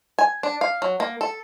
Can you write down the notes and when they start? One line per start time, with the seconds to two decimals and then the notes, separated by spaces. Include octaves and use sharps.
0.19 G#5
0.43 D4
0.61 F5
0.82 F#3
1.00 A#3
1.21 A4